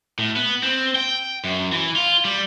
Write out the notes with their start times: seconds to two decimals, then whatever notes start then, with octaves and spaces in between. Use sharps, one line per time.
0.19 A2
0.36 B3
0.63 C4
0.95 G5
1.44 F#2
1.72 E3
1.96 F4
2.25 G3